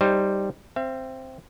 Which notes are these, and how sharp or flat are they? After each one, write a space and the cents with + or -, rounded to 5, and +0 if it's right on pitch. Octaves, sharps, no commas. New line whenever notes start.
G3 +0 D#4 +0 C5 +0
C4 +0 E5 +40